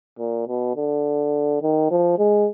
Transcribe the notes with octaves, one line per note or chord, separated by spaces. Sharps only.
A#2
B2
D3
D#3
F3
G#3